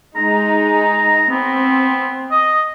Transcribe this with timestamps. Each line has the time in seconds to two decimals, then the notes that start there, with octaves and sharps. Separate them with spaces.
0.16 G#3 D#4 A#5
1.30 B3 C4
2.31 D#5